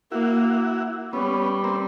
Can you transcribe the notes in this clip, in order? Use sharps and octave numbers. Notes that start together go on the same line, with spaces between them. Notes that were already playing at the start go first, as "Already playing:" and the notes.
A#3 E4 F#4
G3 B3 C#4
A#3 C4